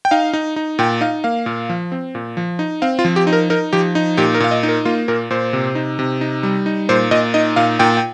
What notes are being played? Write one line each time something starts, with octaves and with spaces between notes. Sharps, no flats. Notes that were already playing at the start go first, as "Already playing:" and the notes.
G5
D#4 F5
D#4
D#4
A#2 G5
D#4 F5
A#3 F5
A#2
F3
C4
A#2
F3
D#4
C4 F5
F4
F3
G4
D#4
A#4
D#4 A#4
F3 G4
D#4
A#2 G4
A#4
A#2 F5
D#5
D#4
A#4
A#3 F4
A#2 A#4
A#2 C5
C3
D#4
C3
D#4
G3
D#4
A#2 C5
A#2 D#5
D#4 D#5
A#2 F5
A#2 G5
G5